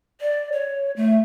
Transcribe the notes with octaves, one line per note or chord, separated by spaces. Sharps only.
D5
C#5
A3